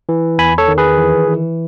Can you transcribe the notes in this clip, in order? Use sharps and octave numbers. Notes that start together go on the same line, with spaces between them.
E3
E2 G#5 B5
A4 C#5
D#3
G#4 B4
E3
E3